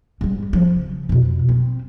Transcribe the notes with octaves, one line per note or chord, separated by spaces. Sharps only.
G#2 G3
F3
C#3
F2 B2
C4